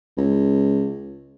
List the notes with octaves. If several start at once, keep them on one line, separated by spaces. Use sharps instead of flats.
C#2